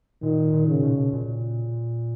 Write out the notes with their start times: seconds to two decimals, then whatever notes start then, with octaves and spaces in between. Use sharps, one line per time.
0.23 A#2 D#3
0.53 A#2
0.67 C#3
0.83 B2
1.13 A#2